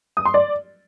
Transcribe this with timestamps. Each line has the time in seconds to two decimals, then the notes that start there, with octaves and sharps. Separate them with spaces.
0.17 D#6
0.25 C6
0.34 D5